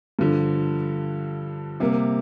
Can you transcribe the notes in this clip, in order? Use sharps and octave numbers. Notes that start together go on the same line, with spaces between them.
G2 D3 F3
C3 G3 A#3